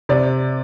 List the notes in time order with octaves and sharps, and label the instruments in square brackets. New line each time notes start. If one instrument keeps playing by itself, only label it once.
[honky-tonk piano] C3 D5